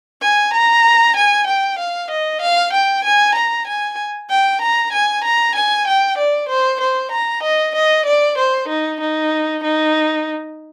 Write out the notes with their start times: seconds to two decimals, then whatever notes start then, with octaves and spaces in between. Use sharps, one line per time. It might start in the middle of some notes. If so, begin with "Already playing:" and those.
0.21 G#5
0.53 A#5
1.16 G#5
1.47 G5
1.79 F5
2.11 D#5
2.41 F5
2.73 G5
3.04 G#5
3.35 A#5
3.67 G#5
4.30 G5
4.62 A#5
4.92 G#5
5.24 A#5
5.55 G#5
5.87 G5
6.18 D5
6.49 C5
6.81 C5
7.11 A#5
7.43 D#5
7.75 D#5
8.05 D5
8.38 C5
8.68 D#4
9.00 D#4
9.63 D#4